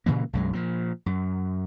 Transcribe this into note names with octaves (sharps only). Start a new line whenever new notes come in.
A#2 C#3 E3 A#3
B1 F#2 G#3
A#2 F3
F#2